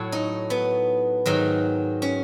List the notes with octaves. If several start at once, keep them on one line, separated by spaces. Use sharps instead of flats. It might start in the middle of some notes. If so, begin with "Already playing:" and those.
Already playing: A2 F#3 C#5
D#4
B3
G#2 D#3 F#3
C#4